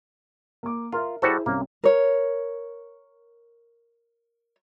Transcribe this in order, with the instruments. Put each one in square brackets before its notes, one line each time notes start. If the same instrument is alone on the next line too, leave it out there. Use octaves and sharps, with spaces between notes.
[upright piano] A#3 D6
[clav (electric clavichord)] F4 [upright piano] A#4 E5
[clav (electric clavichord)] G3 F#4 A4 [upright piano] E4 G#4 C5
[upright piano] C2 C#4 [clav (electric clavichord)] A#3
[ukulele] A#4 C#5